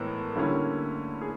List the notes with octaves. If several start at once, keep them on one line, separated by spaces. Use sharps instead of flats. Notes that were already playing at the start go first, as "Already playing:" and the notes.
Already playing: A2 E3 G#3 B3 A#4
D3 G3 A#3 C#4 E4
G#4